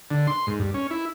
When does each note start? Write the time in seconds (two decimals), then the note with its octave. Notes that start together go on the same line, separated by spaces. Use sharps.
0.11 D3
0.27 C6
0.47 G#2
0.59 G2
0.74 C#4
0.91 E4